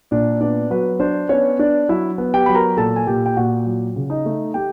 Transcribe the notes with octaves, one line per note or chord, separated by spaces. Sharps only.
A#2 D4 D5
B3 D4 D5
F#3 B4
D4 C5
B3 C#4 C#5
D4 D5
F#3 E4 E5
B3
G4 G5
F#3 B5
A#4 A#5
A#2 A4 A5
G#5
A#2 G4 G5
G5
A#2 F#4 F#5
F#3
C#3
D#4 D#5
A3
A3 G4 G5